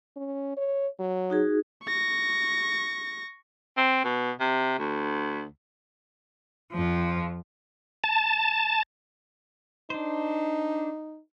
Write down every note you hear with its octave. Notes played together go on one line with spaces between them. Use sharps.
C#4
C#5
F#3
D#4 F#4 G#4
C#6 A#6
C4
B2
C3
D2
F2 F3
A5
D4 D#4 C5